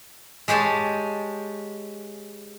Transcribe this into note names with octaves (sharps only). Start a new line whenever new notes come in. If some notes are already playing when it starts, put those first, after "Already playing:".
G#3 G4 G#4 C#5 A5